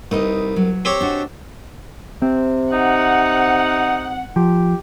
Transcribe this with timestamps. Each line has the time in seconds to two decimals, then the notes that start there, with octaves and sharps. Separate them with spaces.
0.11 C2 D#4 B4 D#5
0.56 F#3
0.85 C4 G4 C#5
1.01 D4 F#4 D#5
2.22 C3 C4
2.72 D#4 F#5
4.36 F3 G4